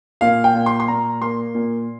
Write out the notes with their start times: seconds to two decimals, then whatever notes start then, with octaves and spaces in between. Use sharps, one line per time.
0.21 A#2 F5
0.44 G5
0.55 A#2
0.66 C6
0.80 C6
0.88 A#2 A#5
1.21 A#3 C6
1.55 A#2